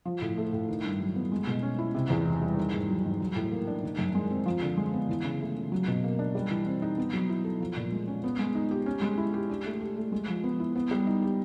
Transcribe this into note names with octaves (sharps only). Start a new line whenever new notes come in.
F3
A2
A3
A2
D#3
G2
F#3
B3
G#3
B2
C#4
E4
C3
E2
E3
G3
D#3
G#2
F#3
G#2
F#3
A2
A#3
D4
D#3
F#2
G#3
C4
F3
D3
G#3
B3
E3
C#3
A3
C#3
F#3
B2
A#3
D4
G3
E3
C4
D#4
B3
F#3
E4
A4
F3
A#2
G#3
C#4
B3
G#3
D#4
G4
C#4
G#3
E4
G4
D4
A3
G4
A3
G#3
F3
B3
E4
B3
G3
D#4
G4